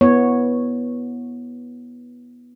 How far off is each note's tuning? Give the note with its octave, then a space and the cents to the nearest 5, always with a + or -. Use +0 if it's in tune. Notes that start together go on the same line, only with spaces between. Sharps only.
B3 -15 E4 +0 C#5 -5